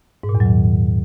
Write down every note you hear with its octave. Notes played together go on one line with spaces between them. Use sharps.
G#2
A#2
E2
F#3
D#3